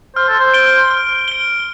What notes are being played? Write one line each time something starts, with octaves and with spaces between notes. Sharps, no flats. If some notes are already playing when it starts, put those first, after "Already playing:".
C5 F6
A4
C5
D7 G7
F6
D7 G7